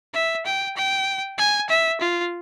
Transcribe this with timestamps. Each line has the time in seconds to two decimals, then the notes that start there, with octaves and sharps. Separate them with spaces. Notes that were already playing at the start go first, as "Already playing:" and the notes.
0.14 E5
0.46 G5
0.76 G5
1.38 G#5
1.69 E5
2.01 F4